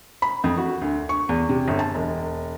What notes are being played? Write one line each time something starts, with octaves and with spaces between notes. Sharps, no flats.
B5
F2
F#4
D2
C#6
E2
C3
G1
A5
E1